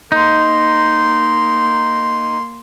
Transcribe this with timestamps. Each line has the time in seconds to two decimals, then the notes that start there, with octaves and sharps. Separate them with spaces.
0.12 A#3 D#4 C6